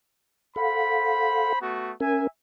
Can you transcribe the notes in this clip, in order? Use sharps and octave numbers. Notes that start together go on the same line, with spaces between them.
A4 C5 F5 F#5 B5
A3 B3 F#4
C#4 A#4 E5 G#5